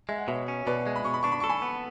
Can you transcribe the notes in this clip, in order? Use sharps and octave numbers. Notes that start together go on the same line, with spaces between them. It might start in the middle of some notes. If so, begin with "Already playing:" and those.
G#3 E5
F#5
B2 C#5 E5
C#4
B2 B4 D5
G#3
B5
B2 C#6
B5
D4 C#6
B5
A4 C#6
G#5 B5
B3